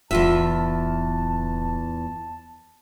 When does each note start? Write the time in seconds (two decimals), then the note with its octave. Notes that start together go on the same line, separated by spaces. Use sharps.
0.11 D1 E2 F4 E5 A5